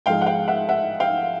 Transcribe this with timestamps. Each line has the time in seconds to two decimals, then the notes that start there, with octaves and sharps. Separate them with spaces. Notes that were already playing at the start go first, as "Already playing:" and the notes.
0.06 G#2 F3 G#3 F5 G5
0.22 F#5
0.26 F5 G5
0.48 E5 F#5
0.69 E5 F#5
1.00 F5 G5